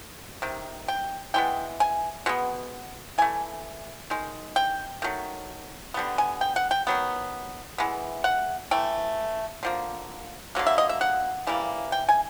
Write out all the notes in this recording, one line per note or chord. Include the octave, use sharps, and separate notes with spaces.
C3 D#3
G5
E3 G#3 B3 G5
G#5
B2 G#3 B3
E3 A3 G#5
D#3 G#3
G5
D#3 F#3 A3
D3 G3 B3
G#5
G5
F#5
G5
D#3 F#3 B3
E3 G#3 B3
F#5
E3 A3 G5
D3 F3 A#3
D3 F#3 A#3
E5
D#5
E5
F#5
C#3 E3 G3 A#3
G5
G#5